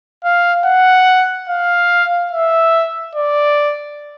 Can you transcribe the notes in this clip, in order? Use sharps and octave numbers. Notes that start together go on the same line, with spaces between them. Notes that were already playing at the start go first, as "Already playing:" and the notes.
F5
F#5
F5
E5
D5